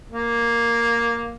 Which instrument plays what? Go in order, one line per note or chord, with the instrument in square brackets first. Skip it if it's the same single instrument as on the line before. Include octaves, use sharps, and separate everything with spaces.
[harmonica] A#3